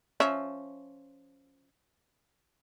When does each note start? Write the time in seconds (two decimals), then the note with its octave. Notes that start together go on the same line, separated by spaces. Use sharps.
0.20 F3 C#4 E5